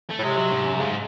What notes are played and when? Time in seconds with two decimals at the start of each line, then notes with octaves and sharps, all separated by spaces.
0.11 A3
0.19 A2
0.23 C3 G#3
0.37 F#3
0.51 G#2
0.66 F#2
0.74 C3
0.79 G#2 C#3